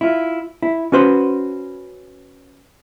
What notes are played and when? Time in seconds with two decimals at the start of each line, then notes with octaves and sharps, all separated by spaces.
0.01 E4 F4
0.62 E4
0.92 C#4 F#4 B4 C5